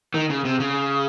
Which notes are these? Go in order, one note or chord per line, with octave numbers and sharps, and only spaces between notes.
D#3
C#3
C3
C#3